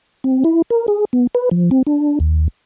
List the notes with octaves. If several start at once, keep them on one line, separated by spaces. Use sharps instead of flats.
C4
E4
A#4
G#4
B3
B4
F3
C4
D4
D#2